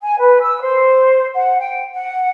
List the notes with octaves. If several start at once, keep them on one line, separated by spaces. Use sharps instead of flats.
G#5
B4
E6
C5
F#5
G5
F#5